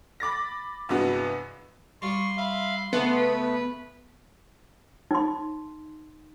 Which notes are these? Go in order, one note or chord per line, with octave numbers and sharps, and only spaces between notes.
B5 D6 A6 A#6
G2 C3 E3 G#3 B3 F#4
G3 F4 C6 C#6
E5 F5 B5
C#3 A3 B3
B4
D#4 C6